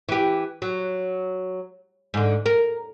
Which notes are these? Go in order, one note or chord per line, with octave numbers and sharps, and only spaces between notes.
E3 G4
F#3
G#2 D3
A#4